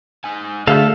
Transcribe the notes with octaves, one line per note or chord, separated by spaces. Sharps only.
D#4 G#5
D3 A3 F#4 G#4 A4 E5 F5